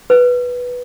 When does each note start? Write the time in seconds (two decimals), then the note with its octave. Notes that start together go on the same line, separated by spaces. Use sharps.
0.10 B4